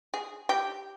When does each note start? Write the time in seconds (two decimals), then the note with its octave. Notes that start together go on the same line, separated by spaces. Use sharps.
0.14 G#4
0.49 G4